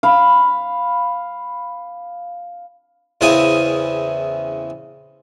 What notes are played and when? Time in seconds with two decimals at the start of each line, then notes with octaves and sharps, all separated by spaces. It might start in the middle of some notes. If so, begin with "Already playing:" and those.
0.03 F5 B5
3.21 E2 C#3 C4 E4 G#5 D#6